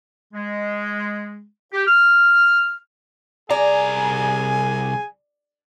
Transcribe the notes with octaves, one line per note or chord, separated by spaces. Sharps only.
G#3
G4
F6
C2 G#4 D5 G#5 A#5